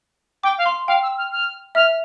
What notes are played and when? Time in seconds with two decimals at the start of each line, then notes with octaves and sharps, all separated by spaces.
0.43 G5 D6
0.58 F5
0.66 C6
0.87 F5 G5
1.02 E6
1.17 F6
1.32 F6
1.75 E5 F6